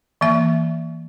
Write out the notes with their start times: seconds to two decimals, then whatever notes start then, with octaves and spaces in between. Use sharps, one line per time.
0.21 E3 A#3 E5